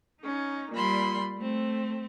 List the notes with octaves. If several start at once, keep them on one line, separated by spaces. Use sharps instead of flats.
C#4 D#4
A#2 G3 B5 C6
A3 C4